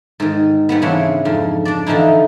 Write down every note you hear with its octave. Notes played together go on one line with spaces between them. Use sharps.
G#2 D#3
G#2 G3 B3
C#3 E3 C4 D4 C#5
F2 G#2
D4 D5
D3 E3 F3 D#4 E4